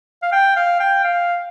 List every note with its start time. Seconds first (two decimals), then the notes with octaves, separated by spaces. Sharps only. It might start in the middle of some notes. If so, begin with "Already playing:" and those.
0.23 F5
0.32 G5
0.56 F5
0.80 G5
1.04 F5